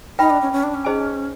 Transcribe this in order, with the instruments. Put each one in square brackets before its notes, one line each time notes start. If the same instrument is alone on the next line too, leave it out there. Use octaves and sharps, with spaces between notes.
[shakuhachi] D#4 [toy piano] B4 E5 G5 B5
[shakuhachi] D4
C#4
C#4
D4
C#4
[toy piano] D#4 G#4 C5 D#5 G#5